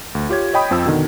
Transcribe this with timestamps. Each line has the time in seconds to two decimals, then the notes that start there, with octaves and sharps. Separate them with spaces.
0.15 D2
0.29 F4 G4 C#5 G#6
0.53 C#5 D#5 G5 B5 D#6
0.71 F2 F3 G5 E6
0.86 B2 D3 D#3